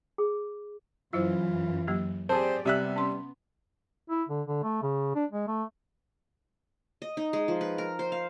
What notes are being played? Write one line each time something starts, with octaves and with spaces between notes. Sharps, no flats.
G#4
F#2 E3 F#3 E4 F4 C5
F#3 A#3 G4
C4 G4 G#4 C5 D5 A5
C3 G3 B3 E5 F#6
C#4 C6
E4
D3
D3
A3
C#3
D4
G#3
A3
D#5
D#4
G#3
F3
B4
A#4
C5
F5